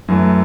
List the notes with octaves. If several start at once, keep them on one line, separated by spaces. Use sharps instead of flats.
F#2 E3 A3